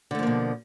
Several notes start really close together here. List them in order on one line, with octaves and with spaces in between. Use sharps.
D3 A3 F3 A#3 B2